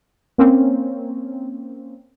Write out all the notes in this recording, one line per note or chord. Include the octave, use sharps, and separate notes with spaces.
A#3 C4 C#4